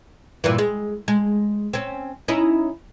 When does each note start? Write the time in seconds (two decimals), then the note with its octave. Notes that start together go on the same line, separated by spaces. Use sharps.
0.44 G2 A#2 E3
0.58 G#3
1.08 G#3
1.73 C4 C#4
2.28 C#4 D#4 E4